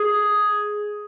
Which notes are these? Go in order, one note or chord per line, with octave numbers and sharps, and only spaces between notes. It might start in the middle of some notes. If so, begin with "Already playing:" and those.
Already playing: G#4